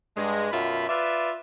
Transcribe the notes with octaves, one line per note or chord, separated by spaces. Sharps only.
G2 G#3
F#2 B2 F4 E5 B5
F4 B4 D5 E5